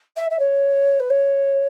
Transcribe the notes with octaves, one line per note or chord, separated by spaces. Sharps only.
E5
E5
C#5
B4
C#5